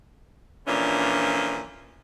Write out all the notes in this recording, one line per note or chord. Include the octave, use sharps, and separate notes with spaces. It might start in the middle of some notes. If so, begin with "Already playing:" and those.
A#2 D3 E3 F3 C#4 D4